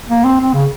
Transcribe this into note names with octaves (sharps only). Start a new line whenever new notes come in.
A#3
C4
C4
C#3